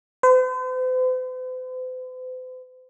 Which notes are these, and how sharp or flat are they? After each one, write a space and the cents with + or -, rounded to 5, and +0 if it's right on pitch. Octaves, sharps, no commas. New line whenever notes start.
C5 -45